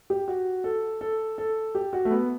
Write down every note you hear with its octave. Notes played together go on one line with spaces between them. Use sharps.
G4
F#4
A4
A4
A4
G4
F#4
A3
B3